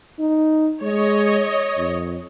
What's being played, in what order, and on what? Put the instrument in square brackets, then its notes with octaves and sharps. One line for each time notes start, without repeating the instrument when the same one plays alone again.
[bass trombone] D#4
[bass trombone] G#3 [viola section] C#5 D#5
[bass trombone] F2